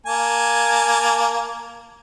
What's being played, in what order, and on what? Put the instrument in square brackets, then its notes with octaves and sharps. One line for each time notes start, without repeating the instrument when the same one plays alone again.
[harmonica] A#3 G#5 A5